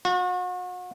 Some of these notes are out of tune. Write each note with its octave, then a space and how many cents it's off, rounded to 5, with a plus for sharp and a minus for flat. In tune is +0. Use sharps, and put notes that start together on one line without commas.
F#4 -40